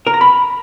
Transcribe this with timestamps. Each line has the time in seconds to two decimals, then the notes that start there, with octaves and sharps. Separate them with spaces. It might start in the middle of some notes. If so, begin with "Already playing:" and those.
0.07 A#4
0.14 A#5
0.21 B5